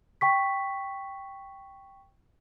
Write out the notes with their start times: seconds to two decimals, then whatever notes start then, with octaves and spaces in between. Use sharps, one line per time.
0.21 G5 C#6 B6